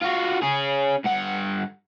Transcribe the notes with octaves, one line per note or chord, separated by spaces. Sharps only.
F4 F#4
C#4 G#4
G2 F#5